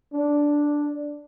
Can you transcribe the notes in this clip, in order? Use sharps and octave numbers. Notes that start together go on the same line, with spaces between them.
D4